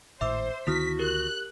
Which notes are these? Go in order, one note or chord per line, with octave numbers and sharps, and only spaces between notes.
G#1 A2 C5 E5 D6 E6
D2 D#3 B3 E4 F#4 D#6 F6 B6
G4 A#4 F#6